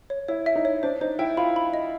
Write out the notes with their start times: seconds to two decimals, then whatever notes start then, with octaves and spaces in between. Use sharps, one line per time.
0.10 C#5
0.28 E4 C#5
0.46 E5
0.56 D#4
0.65 C#5
0.83 D4 C5
1.01 D#4 C5
1.19 E4 G5
1.37 F4 B5
1.56 B5
1.74 D#5